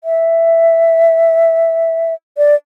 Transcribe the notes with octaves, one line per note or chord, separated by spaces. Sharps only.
E5
D5